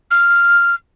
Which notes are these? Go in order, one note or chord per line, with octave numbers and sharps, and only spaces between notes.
F6